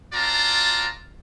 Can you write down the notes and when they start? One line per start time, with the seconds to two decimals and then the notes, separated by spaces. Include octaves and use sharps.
0.13 C4 F4 F#4 D5 A5 A#5